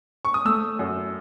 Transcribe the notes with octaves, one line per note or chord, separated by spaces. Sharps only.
C#6
D#6
A3 E6
F#2